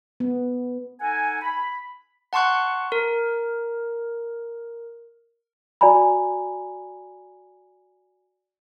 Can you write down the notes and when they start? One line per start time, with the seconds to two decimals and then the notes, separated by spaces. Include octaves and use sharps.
0.20 B3
1.01 D#4 A4 F#5 G#5
1.42 B5
2.33 F#5 A5 C6 C#6 F#6
2.92 A#4
5.81 F#4 D5 G#5 A#5 B5